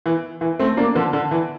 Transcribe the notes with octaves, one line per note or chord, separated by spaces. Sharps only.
E3
E3
A3 C4
A#3 D4
D3 F3
D3
E3